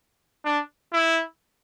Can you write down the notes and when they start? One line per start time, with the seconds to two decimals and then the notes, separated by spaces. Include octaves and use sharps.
0.45 D4
0.93 E4